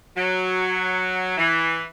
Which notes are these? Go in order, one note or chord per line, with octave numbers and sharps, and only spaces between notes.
F#3
E3